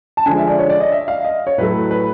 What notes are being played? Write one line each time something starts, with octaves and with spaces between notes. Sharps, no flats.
A5
D3 F3 G#3 G#5
E5
D5
C#5
D5
D#5
E5
F5
D#5
C#5
A2 F#3 A3 B4
B4